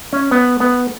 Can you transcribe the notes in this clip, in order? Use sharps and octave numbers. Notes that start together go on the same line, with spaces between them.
C#4
B3
B3